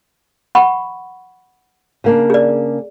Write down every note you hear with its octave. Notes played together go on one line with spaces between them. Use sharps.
F#5 B5 C#6
C#3 A#3 D4
G#4 D5